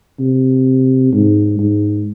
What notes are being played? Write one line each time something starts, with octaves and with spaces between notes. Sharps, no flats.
C3
G#2
G#2